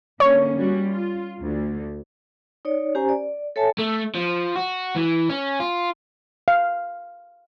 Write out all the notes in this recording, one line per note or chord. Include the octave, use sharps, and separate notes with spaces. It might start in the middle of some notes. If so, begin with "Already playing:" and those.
D3 A#3 C#4 C#5
G3 C#4 F#4
F4
D2
D#4 C#5 D5
C#4 G4 C5 G#5 A#5
D5
A4 C#5 E5 G#5 A5
A3
F3
F#4
E3
C#4
F4
F5